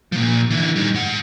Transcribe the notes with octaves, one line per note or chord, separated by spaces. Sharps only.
A#2 F3
D3 E3
G3 D#4
G#2 F#5